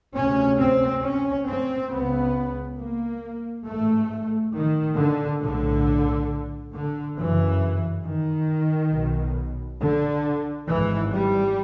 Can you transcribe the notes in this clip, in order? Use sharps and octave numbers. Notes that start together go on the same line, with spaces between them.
D2 C3 C#4
C4
C#4
C4
C#2 C#3 B3
A#3
A1 G#2 A3
D#3
D3
B1 A2 D3
D3
G1 F#2 C#3 E3
D#3
B1 B2
D3
G#1 G#2 E3
G3